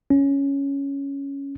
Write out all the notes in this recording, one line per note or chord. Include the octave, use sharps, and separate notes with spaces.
C#4